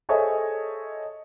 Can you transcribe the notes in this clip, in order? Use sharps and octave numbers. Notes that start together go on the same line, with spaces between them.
G#4 A4 C5 C#5 D#5 E5